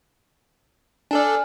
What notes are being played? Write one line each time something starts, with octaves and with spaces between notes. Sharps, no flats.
D4 A4 D5 G#5 F6